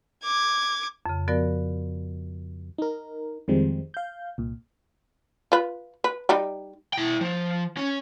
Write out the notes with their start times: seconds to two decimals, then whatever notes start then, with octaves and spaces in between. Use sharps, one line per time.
0.24 D6 G#6
1.06 F2 C#3
1.28 F3 B3 F#4 A#4 D5
2.78 D#4 A#4
3.48 F2 D#3 F3 G3 G#3 C4
3.94 F5 G6
4.38 C2 A#2
5.52 F4 B4
6.04 B4
6.29 G3 D#4 G4
6.93 E4 G5
7.21 F3
7.77 C#4